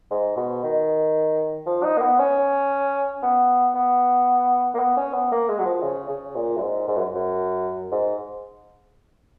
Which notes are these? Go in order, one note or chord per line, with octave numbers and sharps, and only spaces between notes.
G#2
B2
D#3
F3
D#4
A#3
B3
C#4
B3
B3
A#3
B3
C#4
B3
A#3
G#3
F#3
F3
C#3
C#3
A#2
F#2
G#2
G#2
F#2
F#2
G#2